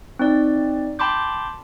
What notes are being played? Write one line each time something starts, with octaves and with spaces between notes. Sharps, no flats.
C4 D#4 D5
G5 A5 B5 C6 D6 G6